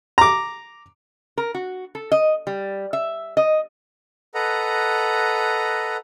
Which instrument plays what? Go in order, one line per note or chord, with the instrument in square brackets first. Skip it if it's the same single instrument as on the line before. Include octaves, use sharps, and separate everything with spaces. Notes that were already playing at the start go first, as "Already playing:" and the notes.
[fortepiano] A#5 D6
[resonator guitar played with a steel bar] A#4
F#4
A4
D#5
G3
E5
D#5
[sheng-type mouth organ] A4 B4 D#5 F#5 A#5